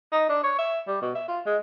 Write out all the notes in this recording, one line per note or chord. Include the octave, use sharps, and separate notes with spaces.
D#4
D4
C#5
E5
G3
B2
E5
F4
G#3